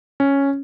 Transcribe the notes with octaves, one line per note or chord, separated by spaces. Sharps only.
C#4